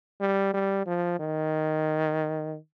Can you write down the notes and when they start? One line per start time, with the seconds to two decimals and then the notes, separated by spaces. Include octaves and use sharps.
0.20 G3
0.54 G3
0.86 F3
1.19 D#3